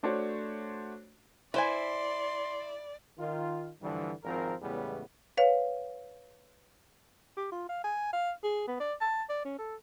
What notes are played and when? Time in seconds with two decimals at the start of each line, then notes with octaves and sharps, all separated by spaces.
0.03 A3 D4 F#4 C5 C#5
1.54 E4 B4 C5 D5 G#5 C6
3.18 D#3 F4
3.81 G2 D3 E3 F3 G3
4.24 G#1 F3 C4 A#4
4.62 E2 A2 C#3 G3 G#3 B3
5.37 B4 C#5 F5
7.37 G4
7.52 F4
7.69 F5
7.84 G#5
8.13 F5
8.43 G#4
8.68 B3
8.80 D5
9.01 A5
9.29 D5
9.45 C#4
9.58 A4